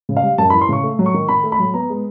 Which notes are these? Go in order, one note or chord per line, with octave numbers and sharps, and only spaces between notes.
C#3
F5
G3
F#2 A5
B5
E3
C6
C#3 C#6
A3
F#3
C#6
D#3
D#3 B5
A3
B5
F#3
B3 A#5
G#3